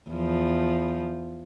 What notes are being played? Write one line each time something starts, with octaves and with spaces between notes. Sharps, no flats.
E2 F3